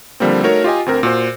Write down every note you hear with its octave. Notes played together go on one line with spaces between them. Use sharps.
D3 F3 G3 A#3 C4
A3 D#4 F#4 A#4 C#5
F4 G4 D#5 G#5
D2 C4 A#4
A#2 F#4 C5